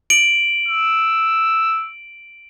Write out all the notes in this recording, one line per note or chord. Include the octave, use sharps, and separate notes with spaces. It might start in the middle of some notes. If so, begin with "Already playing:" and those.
D7 F#7
E6